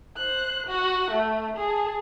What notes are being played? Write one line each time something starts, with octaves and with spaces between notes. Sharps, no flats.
C5 F#6
F#4 F#5
A3
G#4 A5